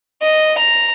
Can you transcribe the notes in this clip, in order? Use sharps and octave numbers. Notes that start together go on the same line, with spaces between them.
D#5
A#5